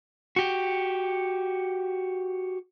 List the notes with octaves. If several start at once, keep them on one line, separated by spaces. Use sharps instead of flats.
F#4 G4